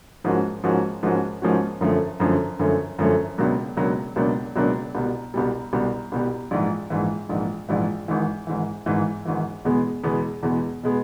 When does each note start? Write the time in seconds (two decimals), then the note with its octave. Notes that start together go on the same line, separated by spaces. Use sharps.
0.24 G#2 F3 A#3 C#4 F#4
0.64 G#2 F3 A#3 C#4 F#4
1.03 G#2 F3 A#3 C#4 F#4
1.42 G#2 F3 A#3 C#4 F#4
1.81 F#2 D3 F3 A3 C#4
2.20 F#2 D3 F3 A3 C#4
2.59 F#2 D3 F3 A3 C#4
2.99 F#2 D3 F3 A3 C#4
3.38 C#2 B2 F#3 A#3 D4
3.77 C#2 B2 F#3 A#3 D4
4.16 C#2 B2 F#3 A#3 D4
4.56 C#2 B2 F#3 A#3 D4
4.95 C2 B2 G3
5.34 C2 B2 G3
5.73 C2 B2 G3
6.12 C2 B2 G3
6.51 A#1 G#2 E3
6.90 A#1 G#2 E3
7.29 A#1 G#2 E3
7.69 A#1 G#2 E3
8.08 G#1 G#2 E3
8.47 G#1 G#2 E3
8.86 G#1 G#2 E3
9.25 G#1 G#2 E3
9.65 E2 B2 G#3 B3
10.03 E2 B2 G#3 B3
10.43 E2 B2 G#3 B3
10.83 B2 G#3 B3